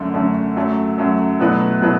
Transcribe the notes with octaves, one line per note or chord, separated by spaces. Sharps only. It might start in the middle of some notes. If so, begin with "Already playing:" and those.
Already playing: F#2 D3 A3
F#2 D3 A3
F#2 F#3 A3
F#2 F#3 A3
B2 F#3 A3 E4 B4
B2 F#3 A3 E4 B4